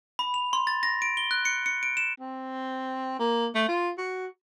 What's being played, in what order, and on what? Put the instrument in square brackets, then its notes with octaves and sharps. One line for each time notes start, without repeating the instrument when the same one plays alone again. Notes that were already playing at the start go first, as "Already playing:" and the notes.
[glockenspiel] B5
F7
C6
A6
A#6
D7
G7
F#6
C#7
C#7
D7
E7
[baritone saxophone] C4
A#3
A3
F4
F#4